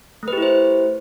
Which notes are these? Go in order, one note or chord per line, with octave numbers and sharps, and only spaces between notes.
A3 E4 G4 B4 C5